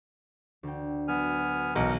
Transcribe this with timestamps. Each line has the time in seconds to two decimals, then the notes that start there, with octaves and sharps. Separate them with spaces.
0.63 D2 G5
1.08 F#3 B3 G#5 F6
1.75 B1 E3 D#4 A#4 F#5